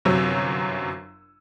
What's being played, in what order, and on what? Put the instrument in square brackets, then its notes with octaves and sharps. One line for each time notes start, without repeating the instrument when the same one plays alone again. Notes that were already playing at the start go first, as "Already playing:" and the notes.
[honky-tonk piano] G1 F#2 C3 F#3 C#5 E6